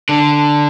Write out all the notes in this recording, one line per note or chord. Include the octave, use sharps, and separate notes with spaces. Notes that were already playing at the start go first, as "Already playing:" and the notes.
D3